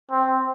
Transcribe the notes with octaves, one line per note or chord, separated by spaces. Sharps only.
C4